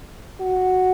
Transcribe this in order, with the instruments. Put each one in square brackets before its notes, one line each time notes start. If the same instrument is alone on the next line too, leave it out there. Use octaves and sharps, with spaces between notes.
[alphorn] F#4